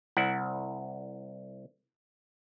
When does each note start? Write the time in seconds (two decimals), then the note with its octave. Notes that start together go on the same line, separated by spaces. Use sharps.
0.17 C2 E4 F#5